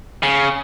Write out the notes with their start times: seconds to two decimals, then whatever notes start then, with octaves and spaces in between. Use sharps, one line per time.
0.23 C#3